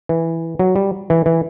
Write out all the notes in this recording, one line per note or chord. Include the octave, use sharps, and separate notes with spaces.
E3
F#3
G3
E3
E3